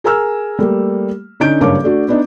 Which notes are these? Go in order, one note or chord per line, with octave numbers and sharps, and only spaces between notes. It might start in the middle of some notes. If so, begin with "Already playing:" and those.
G#4 A#4 G#5 A#5 E6 F6
G3 A3 A#3
D3 C#4 D#4 G6 D7
F#1 G2 A#4 C#5 F5 D6
A3 D4 F#4
B3 D4 D#4